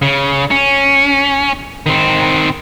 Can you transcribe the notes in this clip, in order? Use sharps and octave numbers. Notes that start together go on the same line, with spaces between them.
C#3
C#4
D#3 C4